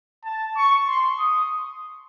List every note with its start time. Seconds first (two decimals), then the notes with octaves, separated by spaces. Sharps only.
0.24 A5
0.56 C#6
0.87 C6
1.19 D#6